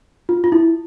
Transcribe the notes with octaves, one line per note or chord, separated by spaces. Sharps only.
F4
F4
E4